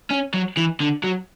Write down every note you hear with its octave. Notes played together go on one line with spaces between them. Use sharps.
C#4
F#3
E3
D3
F#3